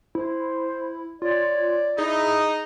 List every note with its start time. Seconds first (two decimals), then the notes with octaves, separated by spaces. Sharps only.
0.15 E4 C5
1.22 F4 C#5 D5
1.98 D#4 E4 G#4